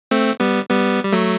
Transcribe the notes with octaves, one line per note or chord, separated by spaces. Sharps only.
A3 C4
G3 B3
G3 B3
G3
F#3 A3